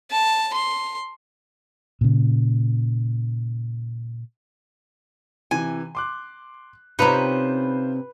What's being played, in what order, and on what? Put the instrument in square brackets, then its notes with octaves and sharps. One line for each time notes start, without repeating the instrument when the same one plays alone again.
[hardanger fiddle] A5
C6
[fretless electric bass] A#2 C#3
[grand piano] C3 E3 [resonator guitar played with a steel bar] G#5
[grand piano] C6 D6 F#6
[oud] C3 C#4 [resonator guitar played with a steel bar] D#4 A#5 [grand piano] F4 C5 [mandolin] B4